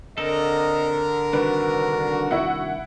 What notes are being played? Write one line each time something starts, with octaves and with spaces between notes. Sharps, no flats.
D3 C4 A4 A#4 D#5
C2 D#3 D4 F#4 B4
E4 F#5